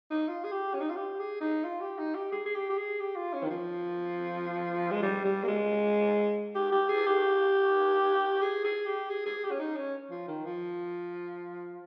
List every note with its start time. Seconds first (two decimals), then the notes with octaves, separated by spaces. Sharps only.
0.11 D#4
0.28 F4
0.44 G#4
0.51 G4
0.74 C#4
0.81 D#4
0.89 F4
0.96 G4
1.19 G#4
1.41 D#4
1.64 F4
1.81 G4
1.98 D#4
2.15 G4
2.32 G#4
2.45 G#4
2.54 G4
2.69 G4
2.77 G#4
3.00 G4
3.16 F4
3.33 C#4
3.43 D#3
3.50 F3
4.91 G#3
5.03 G3
5.24 G3
5.43 A#3
5.48 G#3
6.55 G4
6.71 G4
6.89 G#4
7.06 G4
8.41 G#4
8.64 G#4
8.86 G4
9.09 G#4
9.25 G#4
9.43 G4
9.51 C#4
9.59 D#4
9.76 C#4
10.10 F3
10.28 D#3
10.45 F3